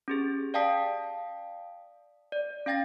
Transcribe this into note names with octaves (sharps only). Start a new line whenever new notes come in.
C#4 G4 G#4
D5 F5 G5 A5 D#6 B6
D5
C#4 F5 G5 A6 A#6